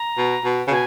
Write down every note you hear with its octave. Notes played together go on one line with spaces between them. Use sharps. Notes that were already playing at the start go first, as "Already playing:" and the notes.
Already playing: A#5
B2
B2
C#3
B2 G#5